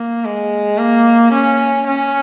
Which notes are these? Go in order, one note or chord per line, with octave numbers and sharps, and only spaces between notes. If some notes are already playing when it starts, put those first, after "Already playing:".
Already playing: A#3
G#3
A#3
C#4
C#4